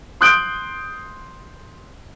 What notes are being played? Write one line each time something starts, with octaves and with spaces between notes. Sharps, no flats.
C6 D#6 F#6 G6 D7